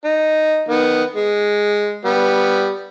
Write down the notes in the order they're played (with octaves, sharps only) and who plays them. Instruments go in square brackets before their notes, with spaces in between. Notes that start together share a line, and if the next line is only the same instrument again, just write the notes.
[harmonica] D#4
D#3 B3
G#3
G3 B3